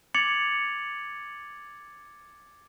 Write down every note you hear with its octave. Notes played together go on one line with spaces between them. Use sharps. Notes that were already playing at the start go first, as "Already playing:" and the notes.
D6 G#6 A6 C#7 F7 F#7